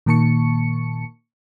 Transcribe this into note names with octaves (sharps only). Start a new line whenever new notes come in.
A#2 D#3 A#3 A5 C#6 C#7